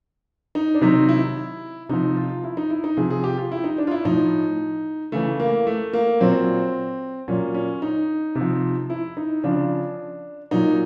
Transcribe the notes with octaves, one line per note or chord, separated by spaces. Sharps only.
D#4
D4
C3 D#3 F#3 D#4
E4
C3 F3 D#4
F4
E4
D#4
E4
D#4
C3 F3 G#4
G#4
G4
F4
E4
D#4
D4
F4
E4
A2 F3 D#4
C#3 E3 A3
A#3
A3
A#3
A#2 F#3 C4
A#2 F#3 C#4
C#4
D#4
C3
F3
E4
D#4
C#3 F3 D4
A#2 F#3 D#4